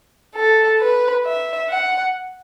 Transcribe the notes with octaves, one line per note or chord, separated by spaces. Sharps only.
A4
B4
E5
F#5